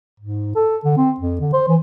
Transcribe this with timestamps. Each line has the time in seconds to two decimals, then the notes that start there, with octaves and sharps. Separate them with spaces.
0.20 G#2
0.55 A4
0.84 D3
0.97 C4
1.20 F2
1.40 D3
1.53 C5
1.68 E3